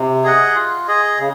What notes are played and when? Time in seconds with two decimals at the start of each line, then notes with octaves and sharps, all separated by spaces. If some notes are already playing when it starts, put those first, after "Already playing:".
Already playing: C3
0.24 G#4 D#5 F#5
0.55 F4
0.88 G#4 D#5
1.19 C#3